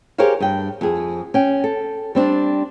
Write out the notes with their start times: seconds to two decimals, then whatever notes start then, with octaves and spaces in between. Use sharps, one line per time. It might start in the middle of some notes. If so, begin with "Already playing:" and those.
0.18 G4 G#4 A#4 C5 C#5 F5
0.40 G2 G5
0.81 F2 G#4
1.34 C#4 G5
1.64 A4
2.15 G3 C4 D4